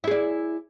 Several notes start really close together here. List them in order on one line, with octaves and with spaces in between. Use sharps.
E4 G#4 D5